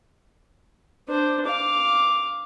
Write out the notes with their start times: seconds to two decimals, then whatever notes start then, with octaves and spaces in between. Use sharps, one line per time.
1.09 D4 C5
1.45 F5 D6